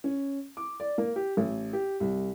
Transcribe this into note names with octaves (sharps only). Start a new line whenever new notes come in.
C#4
D6
D5
A#3
G4
A1
G4
C2